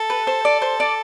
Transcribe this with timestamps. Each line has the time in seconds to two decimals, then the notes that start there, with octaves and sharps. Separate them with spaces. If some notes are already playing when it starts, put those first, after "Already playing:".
Already playing: A4
0.10 B4
0.27 C5
0.45 D5
0.62 C5
0.80 D5